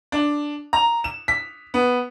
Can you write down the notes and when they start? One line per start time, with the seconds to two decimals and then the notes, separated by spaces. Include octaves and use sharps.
0.12 D4
0.73 A#5
1.04 E7
1.28 B6
1.74 B3